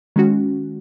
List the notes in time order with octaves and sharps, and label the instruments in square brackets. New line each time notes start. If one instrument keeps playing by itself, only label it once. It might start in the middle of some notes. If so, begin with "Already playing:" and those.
[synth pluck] D#3 G#3 C#4 F#4